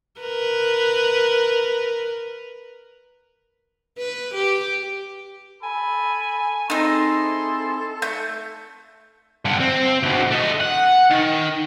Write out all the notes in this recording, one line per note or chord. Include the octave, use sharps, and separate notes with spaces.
A#4 B4
B4
G4
A4 G#5 B5
C4 D#4 E4 G#4 A4 C6
A3 G6
G2 D3
C4
D2 B2
A3 D#5
F#5
D#3